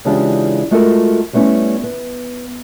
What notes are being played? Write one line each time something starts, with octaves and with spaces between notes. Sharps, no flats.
C#3 E3 G#3 D4 F4 G4
G#3 A3 F4 F#4 A4 A#4
G3 A3 B3 C#4 E4
B3